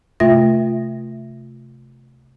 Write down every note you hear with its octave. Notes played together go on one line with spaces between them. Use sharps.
C3 A3 F4 E5 A#6